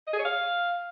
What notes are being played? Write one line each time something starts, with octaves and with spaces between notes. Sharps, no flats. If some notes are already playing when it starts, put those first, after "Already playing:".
D#5
G#4
C#5
F5